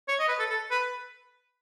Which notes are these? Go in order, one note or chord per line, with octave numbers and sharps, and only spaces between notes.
C#5
D#5
B4
A4
A4
B4